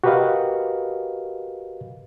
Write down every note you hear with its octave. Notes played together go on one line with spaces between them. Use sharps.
F#4 G4 A#4 B4 D#5 F5